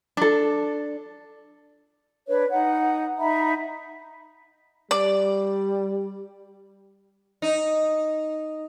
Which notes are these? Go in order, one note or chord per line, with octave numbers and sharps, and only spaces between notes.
D4 A4
D4 B4 C#5
D#4 F#5
D#4 E5 A#5 B5
G3 D5
D#4